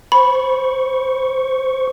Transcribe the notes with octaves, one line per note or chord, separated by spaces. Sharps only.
C5 B5 C#6